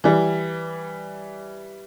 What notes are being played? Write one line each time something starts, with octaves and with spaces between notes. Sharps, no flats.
E3 G3